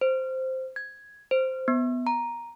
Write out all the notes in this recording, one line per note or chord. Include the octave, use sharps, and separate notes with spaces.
C5
G#6
C5
B3
A#5